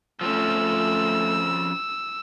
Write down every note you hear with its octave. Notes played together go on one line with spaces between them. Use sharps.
F3 A3 C4 C#4 E6